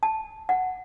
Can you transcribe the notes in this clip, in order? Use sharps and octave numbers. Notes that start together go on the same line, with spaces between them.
A5
F#5